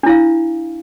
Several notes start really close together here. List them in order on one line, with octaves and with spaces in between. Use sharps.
D4 E4 F5